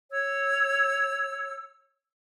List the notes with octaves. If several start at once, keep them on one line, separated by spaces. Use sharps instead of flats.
C#5 E6